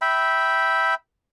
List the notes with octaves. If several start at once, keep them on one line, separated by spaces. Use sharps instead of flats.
E5 G5 B5